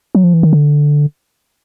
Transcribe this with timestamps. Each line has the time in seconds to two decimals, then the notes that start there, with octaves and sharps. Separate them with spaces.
0.15 F#3
0.24 F3
0.34 E3
0.43 D#3
0.53 D3